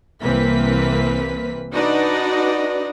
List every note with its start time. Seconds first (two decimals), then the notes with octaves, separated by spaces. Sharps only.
0.22 C2 E3 A#3 C4 B4 B6
1.73 D4 D#4 F#4 B4 D5 D#5